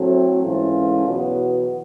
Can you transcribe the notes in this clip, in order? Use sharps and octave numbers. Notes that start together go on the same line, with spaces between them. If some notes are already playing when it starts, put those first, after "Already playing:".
Already playing: A2 F#3 A3 C4
G#2 E3 A3 C#4 F4
E2 B2 F#3 B3